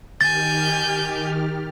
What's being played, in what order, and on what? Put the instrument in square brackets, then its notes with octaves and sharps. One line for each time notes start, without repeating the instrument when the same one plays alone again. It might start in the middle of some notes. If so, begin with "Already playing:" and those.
[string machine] D#3 G4 F6 [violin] G#5 G6 [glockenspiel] A6